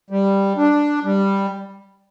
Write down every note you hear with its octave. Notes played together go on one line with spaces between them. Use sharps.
G3
D4
G3